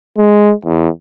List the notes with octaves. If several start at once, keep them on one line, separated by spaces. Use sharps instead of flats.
G#3
E2